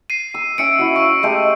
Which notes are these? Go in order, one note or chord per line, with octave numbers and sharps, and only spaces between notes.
C7 D#7
E6
C#4 E5 G#5 E6 C#7 D7
E4 F#4
F5 C#6
G#3 A3 G4